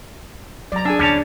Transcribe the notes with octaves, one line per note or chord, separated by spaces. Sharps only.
F#3 D5 A#5
D4 G#4 G#5 E6
D#2 D3 G3 C#4 C#5 D5 A5